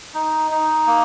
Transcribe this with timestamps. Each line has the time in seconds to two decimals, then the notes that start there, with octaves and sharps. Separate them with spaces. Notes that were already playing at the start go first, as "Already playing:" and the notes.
0.14 D#4
0.51 D#4
0.87 A#3